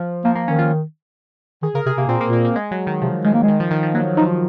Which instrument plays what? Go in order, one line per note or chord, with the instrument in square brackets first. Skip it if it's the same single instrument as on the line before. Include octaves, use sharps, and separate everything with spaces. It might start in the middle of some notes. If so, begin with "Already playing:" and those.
Already playing: [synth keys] F3
[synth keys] F3 [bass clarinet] A#3
[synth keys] A#3
[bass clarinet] D#3 [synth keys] C#4
[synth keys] F4
[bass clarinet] D#3 [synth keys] G#4
[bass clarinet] C#3 [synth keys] A#4
[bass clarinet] C3 [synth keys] G#4
[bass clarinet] C3 [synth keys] A#3
[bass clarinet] A#2 [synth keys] C4
[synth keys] A#3
[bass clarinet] A#2
[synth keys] A#3
A#3
G#3
F#3
D#3
[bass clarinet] C3 [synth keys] F3
[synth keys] D#3 [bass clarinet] G#3
[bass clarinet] A#3
[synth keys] D#3 [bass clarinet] G#3
[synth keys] F3
D#3
F3
[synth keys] F#3 [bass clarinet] A#3
[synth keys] F3 [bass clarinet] D#4